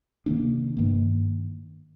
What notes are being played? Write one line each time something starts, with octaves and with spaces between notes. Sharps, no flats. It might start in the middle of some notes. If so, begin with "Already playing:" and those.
C3 D#3 A#3 D4
G2 D#3 A#3